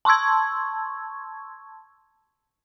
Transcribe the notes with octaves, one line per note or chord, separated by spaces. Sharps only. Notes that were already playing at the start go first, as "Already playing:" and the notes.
A5 C6 C#6 E6 G#6